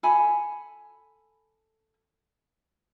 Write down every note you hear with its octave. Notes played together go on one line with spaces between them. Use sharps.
A4 G#5 B5